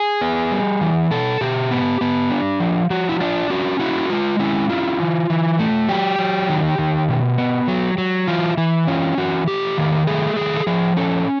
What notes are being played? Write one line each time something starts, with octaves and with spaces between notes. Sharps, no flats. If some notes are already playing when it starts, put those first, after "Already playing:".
Already playing: G#4
B3
G3
E3
B2 A4
B2 G4
B3
B3
D4
F3
F3 F#4
E4
D4 F4
C#4 F#4
E4 F#4
G#3 F4
C#4 E4
E4 F4
E3
E3
A3
F#3 G4
F#3
D#3
D#3
B2
B3
F#3
F#3
E3 F4
E3 E4
C#4 F4
E3 F#4
A3 G4
D#3
A3 G#4
D#3 G#4
A4
F3 G#4
C#4 A4